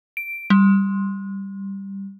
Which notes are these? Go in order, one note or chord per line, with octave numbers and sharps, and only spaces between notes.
D7
G3